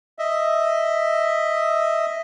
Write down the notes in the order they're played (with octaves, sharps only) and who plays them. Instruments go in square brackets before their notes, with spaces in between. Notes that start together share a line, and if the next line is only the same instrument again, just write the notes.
[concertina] D#5 E5